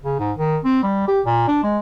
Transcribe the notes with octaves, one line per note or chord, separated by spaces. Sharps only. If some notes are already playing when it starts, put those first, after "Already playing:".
C#3
G#2
D#3
C4
G3
G4
A#2
D4
G#3